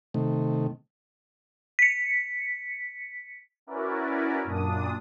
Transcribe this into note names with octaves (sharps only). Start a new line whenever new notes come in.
C3 D#3 A3
B6 C#7
C#4 E4 F#4 A#4 B4 D5
F#2 A#2 D4 D#6